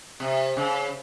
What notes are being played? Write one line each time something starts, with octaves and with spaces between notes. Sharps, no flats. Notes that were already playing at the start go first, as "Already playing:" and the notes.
C3
C#3